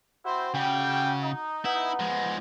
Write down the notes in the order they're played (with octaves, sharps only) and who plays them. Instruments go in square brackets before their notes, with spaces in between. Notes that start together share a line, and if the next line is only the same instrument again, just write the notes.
[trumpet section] C4 E4 C5 [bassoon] F#4
[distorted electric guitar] C#3 [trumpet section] G3 G5
[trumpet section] D#4
[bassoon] B3 [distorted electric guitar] E4
[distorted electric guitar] F3 G#3